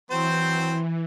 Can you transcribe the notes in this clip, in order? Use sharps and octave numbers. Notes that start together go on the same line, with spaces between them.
E3 F#3 C4 C5